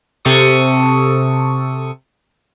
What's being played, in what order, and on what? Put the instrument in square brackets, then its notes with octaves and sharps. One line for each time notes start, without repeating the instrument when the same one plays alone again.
[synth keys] C3 A4 C#6 D#6